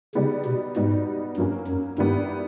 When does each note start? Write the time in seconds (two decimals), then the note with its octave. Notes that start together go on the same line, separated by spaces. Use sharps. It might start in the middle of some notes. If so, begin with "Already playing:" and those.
0.15 C#3 G3 B3 D#4 G4
0.46 B2
0.76 G#2 G3 B3 D#4 F#4
1.37 G2 F#3 A#3 C#4
1.68 F#2
1.98 G2 D#3 G3 B3 E4 G4